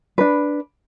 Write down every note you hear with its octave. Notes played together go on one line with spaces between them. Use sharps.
D4 B4